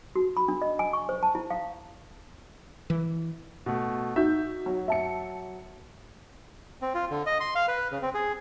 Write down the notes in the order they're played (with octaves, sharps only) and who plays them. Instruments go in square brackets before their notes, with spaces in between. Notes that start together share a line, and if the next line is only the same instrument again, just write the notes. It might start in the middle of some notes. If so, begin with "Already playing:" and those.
[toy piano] F#4
B5
D4
D#5
G#5
C#6
C5
A5
E4
F5
[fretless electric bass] E3
[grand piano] B2 A3
[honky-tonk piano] D#4 F#4 G6 [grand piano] E5
[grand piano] F#3
[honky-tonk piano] E5 A5 C#7
[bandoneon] C4
F4
D3
D#5
C6
F5
B4
C#3
C4
G#4